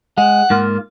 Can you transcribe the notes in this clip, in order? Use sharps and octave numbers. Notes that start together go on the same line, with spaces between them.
G#3 F#5
G#2 A#3 F4